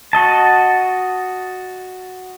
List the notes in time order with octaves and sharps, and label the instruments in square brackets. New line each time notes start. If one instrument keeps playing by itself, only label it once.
[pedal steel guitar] F#4 D#5 A5